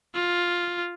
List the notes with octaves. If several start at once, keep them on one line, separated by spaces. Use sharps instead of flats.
F4